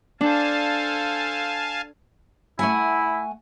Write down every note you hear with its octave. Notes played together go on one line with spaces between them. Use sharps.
D4 A4 C5 F5 G#5 A5
A3 E4 F#5 G#5